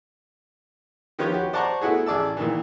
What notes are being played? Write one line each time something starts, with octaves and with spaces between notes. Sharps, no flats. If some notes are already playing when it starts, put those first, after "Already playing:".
D#3 F3 G4 B4 C#5
F#4 G4
C5 D5 F#5 A5 A#5 C#6
A3 B3 E4 F#4 G#4
A1 G#4 D5 A5 E6
A#2 D#3 E3